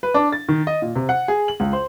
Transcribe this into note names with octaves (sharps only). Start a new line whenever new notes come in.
B4
D4
A6
D#3
D#5
A#2
C3
F#5
G#4
F#7
C#2
C5